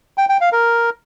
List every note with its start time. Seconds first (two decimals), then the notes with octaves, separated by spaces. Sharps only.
0.18 G5
0.29 G5
0.41 F5
0.52 A#4